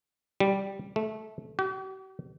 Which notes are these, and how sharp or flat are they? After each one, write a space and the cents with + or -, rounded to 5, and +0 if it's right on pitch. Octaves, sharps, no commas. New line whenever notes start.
G3 -5
A3 -20
G4 -45